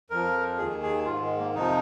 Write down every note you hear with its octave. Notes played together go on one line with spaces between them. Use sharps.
F2 F3 A#4
D#2 D#3 G#4
G#4
G#2 D#3 F4
G#3
A#3
F2 C3 F3 D#4